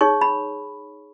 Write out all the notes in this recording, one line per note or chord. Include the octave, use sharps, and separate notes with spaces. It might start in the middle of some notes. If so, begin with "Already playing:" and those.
D#4 G#4 C#5 C#6
B5